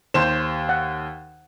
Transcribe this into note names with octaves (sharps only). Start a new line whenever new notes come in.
D#2 C5 E7
F#5